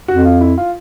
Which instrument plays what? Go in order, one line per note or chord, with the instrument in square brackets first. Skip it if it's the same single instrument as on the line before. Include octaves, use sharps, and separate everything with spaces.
[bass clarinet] F2 [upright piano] F#4
[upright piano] F4
E4
F4